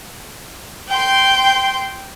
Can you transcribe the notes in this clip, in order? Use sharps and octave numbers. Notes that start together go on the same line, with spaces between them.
G5 C6